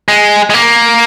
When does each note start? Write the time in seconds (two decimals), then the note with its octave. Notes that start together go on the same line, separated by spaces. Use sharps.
0.09 G#3
0.50 G#3
0.54 A#3